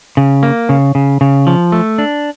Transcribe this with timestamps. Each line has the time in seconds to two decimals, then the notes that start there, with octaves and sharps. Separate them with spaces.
0.17 C#3
0.43 A#3
0.69 C#3
0.95 C#3
1.21 C#3
1.47 F3
1.72 A3
1.98 D4